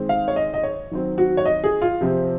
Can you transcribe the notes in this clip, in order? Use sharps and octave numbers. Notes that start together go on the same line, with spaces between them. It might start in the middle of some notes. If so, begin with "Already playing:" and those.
Already playing: D#3 G#3 C4
F5
C#5
D#5
D#5
C#5
D#3 F#3 C4
F#4
C#5
D#5
G#4
F4
C3 F3 C4